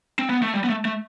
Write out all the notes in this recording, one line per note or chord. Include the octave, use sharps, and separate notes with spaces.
C4
B3
A3
G3
B3
A3
A3